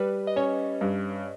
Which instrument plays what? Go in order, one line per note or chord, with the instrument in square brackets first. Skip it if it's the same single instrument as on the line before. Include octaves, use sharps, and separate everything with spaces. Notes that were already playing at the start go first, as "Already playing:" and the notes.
Already playing: [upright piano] G3 [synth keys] B4
[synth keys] D#5
[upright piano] C#4 [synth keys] C#5
[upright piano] G2